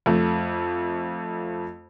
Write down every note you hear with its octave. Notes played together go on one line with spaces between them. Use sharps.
F2 A3